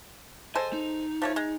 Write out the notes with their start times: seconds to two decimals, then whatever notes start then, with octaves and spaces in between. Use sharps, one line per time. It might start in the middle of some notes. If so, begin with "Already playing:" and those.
0.56 G#3 A4 C5 G#5
0.73 D#4
1.22 F3 A3 C#5
1.36 G#3